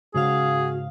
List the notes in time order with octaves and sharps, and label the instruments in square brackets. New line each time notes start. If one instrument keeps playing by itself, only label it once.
[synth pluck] G#2 C#3 F5 [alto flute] F#4 [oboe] G#4